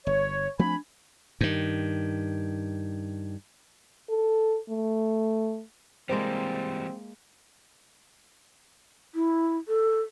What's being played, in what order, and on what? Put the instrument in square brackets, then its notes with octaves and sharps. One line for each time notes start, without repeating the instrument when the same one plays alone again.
[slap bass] G1 [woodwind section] C#5
[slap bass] F3 A3 C4 [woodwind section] D4 G#5 B5
[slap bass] G2 D#3
[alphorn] A4
A3
[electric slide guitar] E3 G3 [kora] G#3 A#3 G5 [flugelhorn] C4 [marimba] C5
[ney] E4
A4